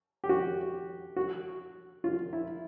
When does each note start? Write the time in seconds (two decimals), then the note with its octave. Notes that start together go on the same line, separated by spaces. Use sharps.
0.24 G4
0.29 F#4
1.16 F#4
2.04 F4
2.33 E4